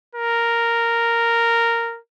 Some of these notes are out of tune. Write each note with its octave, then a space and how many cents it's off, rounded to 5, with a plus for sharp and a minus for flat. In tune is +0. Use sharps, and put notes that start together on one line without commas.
A#4 -5